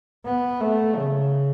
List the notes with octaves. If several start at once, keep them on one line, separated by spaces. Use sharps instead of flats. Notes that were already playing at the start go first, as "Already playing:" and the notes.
B3
A3
C#3